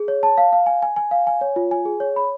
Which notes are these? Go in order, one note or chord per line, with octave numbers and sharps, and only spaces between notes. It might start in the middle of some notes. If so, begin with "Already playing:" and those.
Already playing: G#4
C#5
A5
F5
F5
G#5
G#5
G#5
F5
G#5
C#5
F4
G#5
G#4
C#5
B5